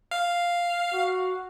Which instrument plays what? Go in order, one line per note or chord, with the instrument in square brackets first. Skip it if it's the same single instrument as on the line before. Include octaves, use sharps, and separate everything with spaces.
[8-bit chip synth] F5
[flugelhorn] F#4